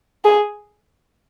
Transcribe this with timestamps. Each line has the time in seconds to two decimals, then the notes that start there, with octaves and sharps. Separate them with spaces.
0.24 G#4